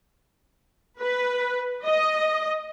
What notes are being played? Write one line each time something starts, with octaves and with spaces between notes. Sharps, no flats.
B4
D#5